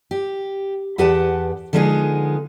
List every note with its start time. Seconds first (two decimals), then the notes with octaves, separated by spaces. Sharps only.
0.11 G4
0.98 E2 G4 B4 F#5 A5
1.73 D3 F3 G#3 B3 D#4 G#4